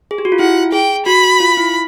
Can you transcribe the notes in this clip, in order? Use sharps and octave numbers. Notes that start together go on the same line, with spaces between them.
G#4
G4
F#4
F4
E4 F#5
G#4 G5
F#4 B5
F4
E4